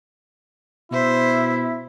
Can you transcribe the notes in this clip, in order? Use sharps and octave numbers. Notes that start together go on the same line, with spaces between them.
B2 E4 C5 E5